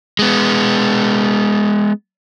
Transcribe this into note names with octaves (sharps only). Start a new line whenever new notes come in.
G#3 B3